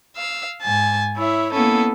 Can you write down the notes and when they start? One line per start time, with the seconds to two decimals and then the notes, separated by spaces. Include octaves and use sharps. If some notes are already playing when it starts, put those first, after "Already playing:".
0.15 F5 E6
0.63 G#2 G#5 A5
1.16 E4 C#5 E5
1.52 A#3 B3 C#4 E4 A4